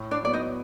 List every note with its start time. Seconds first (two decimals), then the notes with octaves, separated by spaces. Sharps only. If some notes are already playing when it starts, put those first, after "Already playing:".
Already playing: A2
0.11 D4 D5
0.22 F#3 B3 D5
0.33 D#4 D#5